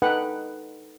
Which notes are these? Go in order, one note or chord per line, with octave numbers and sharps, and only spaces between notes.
D#4 A4 B4 F#5 G5